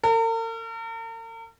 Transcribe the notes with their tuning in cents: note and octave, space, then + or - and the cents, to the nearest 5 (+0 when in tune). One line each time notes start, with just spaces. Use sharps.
A#4 -45